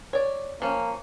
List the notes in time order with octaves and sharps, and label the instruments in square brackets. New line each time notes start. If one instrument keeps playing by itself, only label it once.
[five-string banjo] C#5 D5
[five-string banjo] F3 C#4 [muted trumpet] A#3